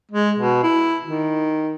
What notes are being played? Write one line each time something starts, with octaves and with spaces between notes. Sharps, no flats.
G#3
B2
E4
D#3